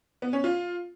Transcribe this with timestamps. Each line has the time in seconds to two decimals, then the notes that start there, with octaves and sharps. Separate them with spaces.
0.22 B3
0.33 C#4
0.44 F4